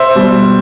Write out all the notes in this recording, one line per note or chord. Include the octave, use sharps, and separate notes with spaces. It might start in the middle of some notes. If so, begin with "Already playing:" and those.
Already playing: C5 E5
B2 G3